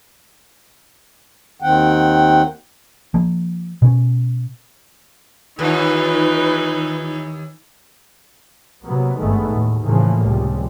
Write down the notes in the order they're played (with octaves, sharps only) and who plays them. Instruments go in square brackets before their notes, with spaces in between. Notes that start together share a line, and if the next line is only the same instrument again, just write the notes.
[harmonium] D#2 D#3 C4 F#5 G5
[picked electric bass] F3 A#3
B2 C#4
[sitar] D#2 [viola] E3 D#4 [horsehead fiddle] F4 B4
[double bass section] C3 F#3 A#3 B3
G#1 G2 D#3 G#3 A3 B3
D#2 A2
A2 C#3 E3 F3 A#3
C#2 C3 F3 G3